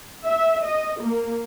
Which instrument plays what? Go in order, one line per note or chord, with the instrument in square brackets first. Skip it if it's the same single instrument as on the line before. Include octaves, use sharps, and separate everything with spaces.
[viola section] E5
D#5
A#3